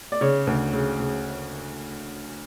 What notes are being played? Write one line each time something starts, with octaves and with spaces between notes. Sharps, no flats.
D5
C#3 C#5
D2
C#3
C#3